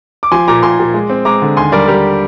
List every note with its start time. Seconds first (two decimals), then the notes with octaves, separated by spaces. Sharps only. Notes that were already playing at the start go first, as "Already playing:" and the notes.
0.23 D6
0.32 F3 G#5 C6
0.48 A#2 A#5 D6
0.63 A#2 G#5 C6
0.79 A#2
0.94 G#3
1.10 C4
1.25 G#3 A#5 D6
1.42 D3
1.57 D#2 G#5 C6
1.72 G3 A#4 D5
1.88 G3 G4 A#4